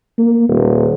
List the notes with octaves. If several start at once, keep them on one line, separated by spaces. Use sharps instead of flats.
A#3
D#1